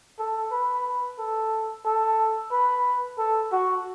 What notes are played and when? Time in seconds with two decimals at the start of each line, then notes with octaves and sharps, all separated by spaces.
0.19 A4
0.51 B4
1.19 A4
1.85 A4
2.52 B4
3.18 A4
3.52 F#4